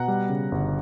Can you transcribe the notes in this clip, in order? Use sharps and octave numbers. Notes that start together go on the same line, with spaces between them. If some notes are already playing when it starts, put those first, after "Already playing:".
Already playing: B2 F#5 A#5
G3
C#3
G1